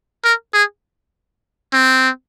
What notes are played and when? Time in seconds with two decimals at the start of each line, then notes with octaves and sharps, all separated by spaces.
0.24 A#4
0.54 G#4
1.73 C4